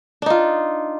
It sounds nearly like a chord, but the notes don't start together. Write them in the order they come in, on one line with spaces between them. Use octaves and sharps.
D4 D#4 F4